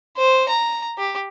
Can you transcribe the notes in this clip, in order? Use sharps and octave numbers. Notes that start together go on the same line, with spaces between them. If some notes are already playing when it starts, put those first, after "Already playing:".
C5
A#5
G4